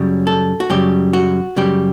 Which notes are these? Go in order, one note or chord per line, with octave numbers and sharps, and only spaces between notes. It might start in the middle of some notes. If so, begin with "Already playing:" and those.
Already playing: F#2 C#3 G3
A4
F#4
F#2 C#3 G3 G4
F#4
F#2 C#3 G3 G4